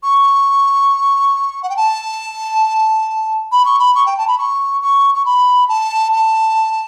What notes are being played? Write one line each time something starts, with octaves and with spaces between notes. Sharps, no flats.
C#6
F#5
G5
A5
B5
C#6
B5
C#6
G5
A5
B5
C#6
C#6
C#6
B5
A5
A5